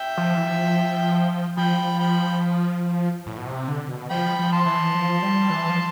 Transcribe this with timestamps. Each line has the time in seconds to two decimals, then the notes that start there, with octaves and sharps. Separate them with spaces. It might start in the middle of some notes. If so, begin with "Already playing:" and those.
Already playing: E5 G5
0.17 F3
0.37 E3
0.45 F3
1.57 F3 G5 B5
1.99 G5 B5
3.26 A2
3.38 B2
3.46 C3
3.68 D3
3.89 B2
4.10 F3 G5 B5
4.39 F3
4.53 A5 C6
4.66 E3
4.95 F3
5.23 G3
5.50 E3
5.69 F3